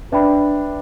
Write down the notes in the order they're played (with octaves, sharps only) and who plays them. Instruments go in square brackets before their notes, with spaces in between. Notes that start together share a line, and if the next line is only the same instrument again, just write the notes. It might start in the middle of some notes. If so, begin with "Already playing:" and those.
[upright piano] D4 [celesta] B4 E5 G5 B5